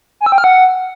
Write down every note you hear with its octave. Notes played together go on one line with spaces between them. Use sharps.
G#5
E6
G5
F6
F#5